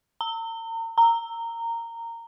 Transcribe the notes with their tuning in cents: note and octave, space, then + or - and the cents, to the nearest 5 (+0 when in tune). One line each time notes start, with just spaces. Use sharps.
A#5 -40
A#5 -15